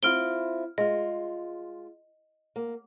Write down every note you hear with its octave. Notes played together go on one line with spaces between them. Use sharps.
C4 E4 F4 F6 D7 G7
G#3 F4 D#5
A#3